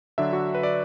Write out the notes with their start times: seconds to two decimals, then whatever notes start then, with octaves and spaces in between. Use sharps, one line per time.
0.18 D3 F#3 D4 E5
0.33 F#4
0.55 B4
0.63 D5